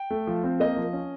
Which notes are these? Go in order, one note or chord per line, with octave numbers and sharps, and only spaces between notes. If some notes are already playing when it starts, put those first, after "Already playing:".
Already playing: G5
A3
F3
C4
A#3 D#5
F3
C#4